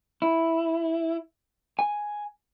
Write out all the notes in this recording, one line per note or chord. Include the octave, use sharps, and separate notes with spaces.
E4
G#5